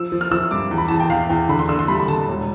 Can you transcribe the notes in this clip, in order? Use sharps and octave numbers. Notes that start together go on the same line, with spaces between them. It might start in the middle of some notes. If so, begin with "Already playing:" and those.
Already playing: F3 E6
F3
F6
F3 E6
G2 D6
E2
B5
E2 A5
G5
E2 F5
E2 G5
D3 B5
C6
D3 E6
C6
G3 B5
B5
D3 A5
E1